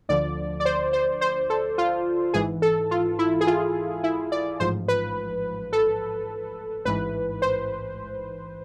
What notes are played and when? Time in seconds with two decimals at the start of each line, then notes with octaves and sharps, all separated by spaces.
0.09 D2 D3 F3 D5
0.60 D5
0.65 C5
0.93 C5
1.21 C5
1.50 A4
1.78 F4
2.34 G#1 G#2 E3 G#4
2.62 A4
2.91 F4
3.19 E4
3.41 G#4
3.47 F4
4.04 E4
4.32 D5
4.60 A1 G#2 F3 C5
4.88 B4
5.73 A4
6.85 A1 G#2 E3 B4
7.42 C5